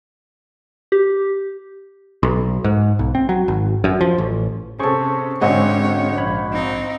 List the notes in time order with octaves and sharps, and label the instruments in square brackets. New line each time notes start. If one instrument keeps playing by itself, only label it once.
[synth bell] G4
[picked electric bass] B1
G#2
B1
C4
F#3
G#1
F#2
F3
A1
[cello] C3 [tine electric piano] C#4 C5 C#6 [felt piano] G#4 A4
[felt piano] G#1 D#5 F#5 [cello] D3 C#5 [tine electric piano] G#3 C4 C#4
[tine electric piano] A#1 B5 G#6
[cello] C4 D#4